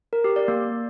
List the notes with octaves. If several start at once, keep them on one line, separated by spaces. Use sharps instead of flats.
A#4
G4
D5
A#3